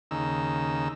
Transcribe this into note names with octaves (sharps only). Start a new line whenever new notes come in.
D#2 C#3 D#4 E6